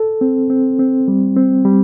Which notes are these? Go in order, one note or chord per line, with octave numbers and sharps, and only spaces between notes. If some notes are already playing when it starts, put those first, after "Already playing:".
Already playing: A4
C4
C4
C4
G3
C4
G3